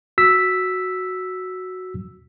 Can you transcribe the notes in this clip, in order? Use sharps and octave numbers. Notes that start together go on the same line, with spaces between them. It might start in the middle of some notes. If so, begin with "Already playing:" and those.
F#4 E6 B6